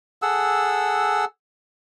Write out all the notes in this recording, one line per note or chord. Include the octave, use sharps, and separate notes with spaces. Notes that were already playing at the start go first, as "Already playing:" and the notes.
G#4 A4 F#5 E6